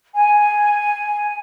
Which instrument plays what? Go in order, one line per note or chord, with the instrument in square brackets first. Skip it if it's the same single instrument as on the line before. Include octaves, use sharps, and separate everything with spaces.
[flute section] G#5